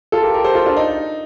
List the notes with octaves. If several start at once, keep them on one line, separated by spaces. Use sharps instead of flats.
F4 A4
G4 A#4
G4 A#4
A4 C5
F4 A4
D4 F4
D#4